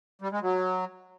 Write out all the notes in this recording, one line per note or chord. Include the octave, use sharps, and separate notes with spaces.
G3
G#3
F#3